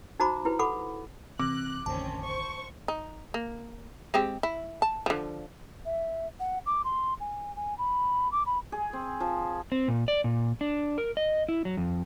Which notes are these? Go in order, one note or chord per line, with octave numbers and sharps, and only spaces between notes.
D#4 F#4 C5 A#5 B5 D6
E4 G4 B4
A4 F#5 B5 D6
C3 E3 C4 D6 F#6
A1 F2 D3 D#3 C4 C#4 A5
C5 C#6
D#4
A#3
G#3 C4 G4
E4
A5
D3 F3
E5
F#5
D6
C6
G#5
G#5
B5
D6
B5
G#4
C4
F3
C4
A#2
D5
A#2
D4
A#4
D#5
E4
F#3
F2